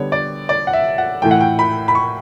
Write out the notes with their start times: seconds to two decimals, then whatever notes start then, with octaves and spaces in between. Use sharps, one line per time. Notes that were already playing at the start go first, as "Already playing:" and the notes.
Already playing: D3 G3 B3 C#5
0.12 D5
0.49 D5
0.67 F#5
0.73 E5
0.98 F#5
1.22 A2 E3 A3 G5
1.31 F#5
1.41 G5
1.59 B5
1.88 B5
1.95 C#6